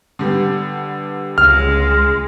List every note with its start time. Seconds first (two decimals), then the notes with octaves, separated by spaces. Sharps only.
0.19 D3 G3 B3
1.38 C#2 G#3 F6